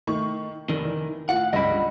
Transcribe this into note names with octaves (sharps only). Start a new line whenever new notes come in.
D#3 A3 C#6
F1 D#3
E3
A2 F4 F#5
F#1 C#2 G2 D#5 B5